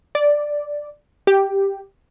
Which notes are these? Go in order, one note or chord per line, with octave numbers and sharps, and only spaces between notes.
D5
G4